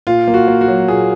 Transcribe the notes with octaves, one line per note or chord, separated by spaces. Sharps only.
A#2 F4
A#3
F#4
A#3
F#4
F#3
A#2 G#4